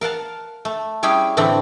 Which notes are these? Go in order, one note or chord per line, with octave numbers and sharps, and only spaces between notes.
A#4 F5 F#5 A5
A3
G3 C#4 E4 G#4 F5 G5
A2 D3 E3 A3 C4 E4